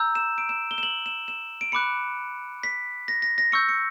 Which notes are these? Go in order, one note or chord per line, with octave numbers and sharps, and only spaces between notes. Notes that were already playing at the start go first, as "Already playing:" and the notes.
Already playing: A#5 E6 G6
E7
D7
E7
G7
E7
F#7
E7
E7
D7
B5 D6 F#6 C#7
B6
A#6
A#6
A#6
C#6 E6 G6 C#7
C#7